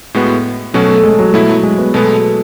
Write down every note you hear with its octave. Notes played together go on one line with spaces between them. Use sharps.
A2 G#3 B3 F#4
B2 F#3 A3 C#4 F#4
A3
G#3
F#3
B2 F#3 A3 E4
F#3
G#3
B3
B2 G#3 A3 B3